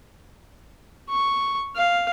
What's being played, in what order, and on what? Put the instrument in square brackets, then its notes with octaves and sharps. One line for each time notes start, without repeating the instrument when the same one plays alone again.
[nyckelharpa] C#6
F5